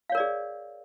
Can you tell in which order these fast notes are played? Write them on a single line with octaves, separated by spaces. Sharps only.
F5 C#5 A#4 D5 G#4